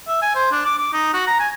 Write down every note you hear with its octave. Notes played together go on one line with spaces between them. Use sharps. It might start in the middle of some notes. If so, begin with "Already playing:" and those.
E5
G#5
C5
D4
D6
D6
D#4
F#4
A#5
G#5